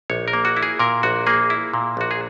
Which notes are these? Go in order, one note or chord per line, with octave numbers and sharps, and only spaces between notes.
A#1 C#5
A#4
A#3
F#4
E4
G#4
A#2 A#4
A#1 F#4
A#3 G#4
E4
A#2
A#1 F#4
G#4